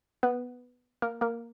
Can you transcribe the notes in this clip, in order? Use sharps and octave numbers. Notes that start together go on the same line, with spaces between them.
B3 B4
A#3 A#4
A#3 A#4